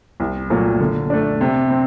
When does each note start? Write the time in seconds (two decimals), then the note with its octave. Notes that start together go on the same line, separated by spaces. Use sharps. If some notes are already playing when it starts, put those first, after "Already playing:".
0.20 C2
0.50 A#2 F#3 A3
0.80 D3
1.10 A3 D4
1.41 C3
1.70 C4